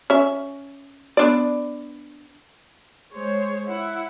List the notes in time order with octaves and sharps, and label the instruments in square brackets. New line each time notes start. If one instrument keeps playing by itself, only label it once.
[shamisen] C#4 E5
B3 D4 D5
[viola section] G#3 C5 C#5
E4 F#5